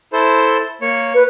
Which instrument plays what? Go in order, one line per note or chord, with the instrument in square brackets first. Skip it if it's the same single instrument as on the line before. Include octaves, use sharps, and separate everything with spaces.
[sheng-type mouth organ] E4 A4 C5
A#3 C#5
[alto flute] B4